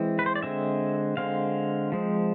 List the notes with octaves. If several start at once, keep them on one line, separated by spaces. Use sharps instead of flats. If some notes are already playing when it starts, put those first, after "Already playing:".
Already playing: E3 G#3 C4
B4
C5
D5
D3 G#3 C4 E5
D3 G#3 C4 F5
F3 G#3 C4